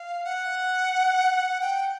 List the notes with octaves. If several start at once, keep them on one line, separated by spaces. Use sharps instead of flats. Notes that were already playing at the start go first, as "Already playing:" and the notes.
Already playing: F5
F#5
G5